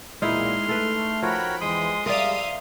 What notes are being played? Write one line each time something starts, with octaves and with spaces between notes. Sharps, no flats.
B1 E2 A#2 G#3 D#4 E4 C6 F6
A3 A4 B4
F3 F#4 A#4 C#5 G5 B5
E2 G#3 C6 D#6
G3 G#3 A#4 D5 E5 F5 C6 D#6